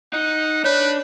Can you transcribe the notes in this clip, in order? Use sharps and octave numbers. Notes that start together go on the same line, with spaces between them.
D#4 F#5
D4 B4 C#5